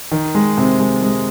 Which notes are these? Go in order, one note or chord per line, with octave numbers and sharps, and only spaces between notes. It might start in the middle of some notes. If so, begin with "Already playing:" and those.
D#3
G#3
C3
G#3
G#3